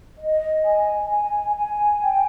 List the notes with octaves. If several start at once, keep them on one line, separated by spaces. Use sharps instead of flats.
D#5
G#5
G#5
G#5
G5